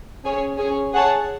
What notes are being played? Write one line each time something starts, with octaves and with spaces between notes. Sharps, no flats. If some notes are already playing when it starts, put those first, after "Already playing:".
C#4 G#4 C#5 G#5
C#4 G#4 C#5
G#4 C#5 F#5 A5